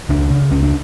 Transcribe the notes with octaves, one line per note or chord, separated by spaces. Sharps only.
C#2 D4
C#3
C#2 C#4
D4